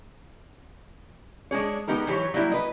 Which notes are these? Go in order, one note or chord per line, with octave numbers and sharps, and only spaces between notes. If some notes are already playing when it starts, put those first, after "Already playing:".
G#3 D4 G#4 C#5
G#3 B3 D#4 G4 A#4
E3 F#3 G4 B4 C#5
F#3 G3 A#3 E4
B4 D#5